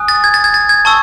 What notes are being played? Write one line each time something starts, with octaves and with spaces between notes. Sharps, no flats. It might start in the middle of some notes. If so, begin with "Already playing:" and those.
Already playing: G#5 D#6 F#6
A6
G#6
A6
G#6
A6
G#6
A5 C#6 E6